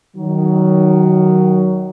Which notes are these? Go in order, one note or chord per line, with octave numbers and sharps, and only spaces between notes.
D#3 F#3